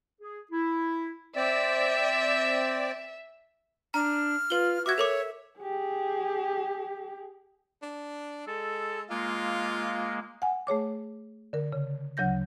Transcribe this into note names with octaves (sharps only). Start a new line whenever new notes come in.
G#4
E4
C4 D5 E5
D4 A#5 F6
F4 B4 G7
F#4 E5 D6 G#6
A4 A#4 C#5 D6
G4 G#4
D4
G#3 A4
G#3 A#3 F4
F#5 G#5
A3 G#4 C#5 D6
D3 A#4
C#3
D2 C#3 F#3 F#5 G6 A#6